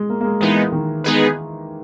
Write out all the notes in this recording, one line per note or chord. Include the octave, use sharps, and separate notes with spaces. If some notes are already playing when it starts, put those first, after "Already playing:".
Already playing: G#3
A#3
A#3
G#3
E3 G#3 B3 D#4
D#3
G#3 B3 D#4 G#4 B4